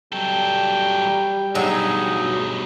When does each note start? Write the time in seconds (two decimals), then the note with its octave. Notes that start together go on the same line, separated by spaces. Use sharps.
0.13 F#3 G3 A4 G5
1.55 G2 B2 F#3 G#3 D#4